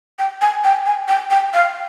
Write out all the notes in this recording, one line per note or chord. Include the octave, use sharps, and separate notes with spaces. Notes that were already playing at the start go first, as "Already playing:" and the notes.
G5
G#5
G5
G#5
G5
G5
F5